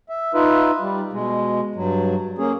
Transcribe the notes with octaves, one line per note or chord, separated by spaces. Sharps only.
E5
D#4 F4 B4 E5
G3
B2 G#3
G2 F#3
A#3 C#4 G#4